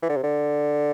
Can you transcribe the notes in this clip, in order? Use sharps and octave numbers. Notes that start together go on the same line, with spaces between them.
E3
D3
C3
D3